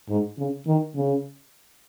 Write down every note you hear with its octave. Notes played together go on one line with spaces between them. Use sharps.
G#2
C#3
D#3
C#3